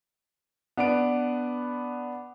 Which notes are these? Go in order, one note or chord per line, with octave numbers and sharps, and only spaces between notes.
B3 D4 B4 D7